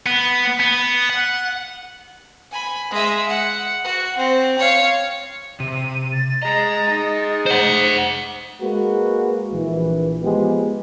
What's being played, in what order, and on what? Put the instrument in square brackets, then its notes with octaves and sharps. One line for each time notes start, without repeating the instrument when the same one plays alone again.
[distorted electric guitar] B3
B3
F#5
[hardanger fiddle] G#5 B5
G#3 E5
F#5
F#4
C4
C#5 F5
[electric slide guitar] C3 [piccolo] D#7
[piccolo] A6
[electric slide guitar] G#4 D#5 [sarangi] A#5 [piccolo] A6
[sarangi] D#4
[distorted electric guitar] C5 F#5 [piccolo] C#7
[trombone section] G#3 A#3 F#4 B4
A#1 E3
F3 G#3 B3 G4